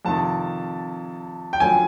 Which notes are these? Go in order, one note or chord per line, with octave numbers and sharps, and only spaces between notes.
F2 C3 D#3 A5
G5
F#2 D3 F3 G#5